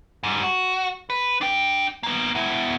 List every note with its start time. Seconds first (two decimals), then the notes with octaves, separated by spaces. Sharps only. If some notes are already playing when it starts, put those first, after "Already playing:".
0.23 G#2 G3
0.43 F#4
1.10 B4
1.41 D4 G5
2.03 A#3 B3
2.35 B2 E4